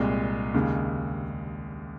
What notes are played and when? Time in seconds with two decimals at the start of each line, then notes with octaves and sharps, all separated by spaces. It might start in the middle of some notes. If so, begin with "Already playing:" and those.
Already playing: C2 A#2 G#3
0.54 D#2 C#3 G#3